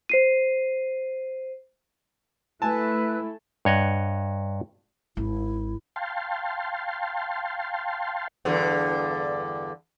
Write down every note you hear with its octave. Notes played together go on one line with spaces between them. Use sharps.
C5 C7 D#7
A3 E4 B4 G#5 A5 E6 F#6
G2 C#5 D#5 F#5
G#1 E4
F5 G5 A5 C6
E2 G2 D3